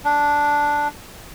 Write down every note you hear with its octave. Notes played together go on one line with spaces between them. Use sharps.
D4